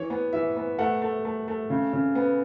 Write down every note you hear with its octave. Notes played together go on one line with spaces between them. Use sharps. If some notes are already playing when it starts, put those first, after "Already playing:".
Already playing: E3 C#5
B3
E3 E5
B3
A3 F#5
A3
A3
A3
C#3
C#3
B3